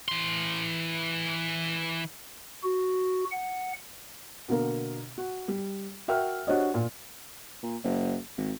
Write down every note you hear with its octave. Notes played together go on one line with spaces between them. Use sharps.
E3 C6
F#4
F#5
B2 D3 A#3
F#4
G3
F#4 A#4 E5 G5 F6
D4 F#4 G4 C5 C#5 D#5
A#2
A#2
F#1
G#1